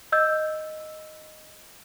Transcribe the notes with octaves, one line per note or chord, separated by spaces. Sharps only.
D#5 E6 G6